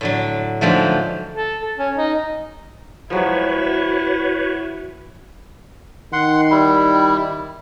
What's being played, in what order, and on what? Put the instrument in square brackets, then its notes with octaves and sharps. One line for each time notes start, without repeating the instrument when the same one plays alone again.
[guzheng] A2 D3 F#3
G#2 D3 F3 F#3 A3
[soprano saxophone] A4
A4
C#4
D#4
[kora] F3 F#3 G#3 [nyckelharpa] E4 [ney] F#4 [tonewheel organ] B4 C#5
[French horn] D#3 [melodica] F#5 C6
[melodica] G3 E4